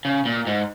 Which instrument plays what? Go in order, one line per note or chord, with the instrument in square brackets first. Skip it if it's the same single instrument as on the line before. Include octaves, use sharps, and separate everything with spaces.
[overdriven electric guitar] C#3
A#2
G#2